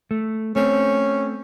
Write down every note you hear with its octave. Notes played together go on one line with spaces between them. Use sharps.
A3
A3 C4 C#4